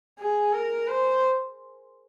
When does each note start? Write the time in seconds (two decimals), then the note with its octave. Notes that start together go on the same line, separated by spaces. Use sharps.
0.19 G#4
0.53 A#4
0.87 C5